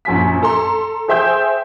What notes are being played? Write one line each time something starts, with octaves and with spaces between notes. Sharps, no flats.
A#1 F#2 G#5 B6
A4 A#5 C6
G#4 C5 E5 G5 C6 G6